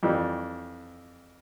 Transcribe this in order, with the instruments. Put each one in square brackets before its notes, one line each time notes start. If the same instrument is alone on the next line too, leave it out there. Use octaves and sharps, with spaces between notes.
[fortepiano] F2 E3 G3